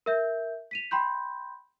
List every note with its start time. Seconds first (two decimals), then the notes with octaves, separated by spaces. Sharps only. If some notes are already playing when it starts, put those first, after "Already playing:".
0.06 A#4 E5 G6
0.71 B6 D#7 F7
0.91 G5 B5 C6 G6